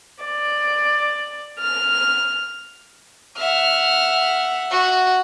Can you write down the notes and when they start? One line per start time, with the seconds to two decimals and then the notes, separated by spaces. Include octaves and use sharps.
0.24 D5
1.60 F6
3.38 E5 F#5 F6
4.71 F#4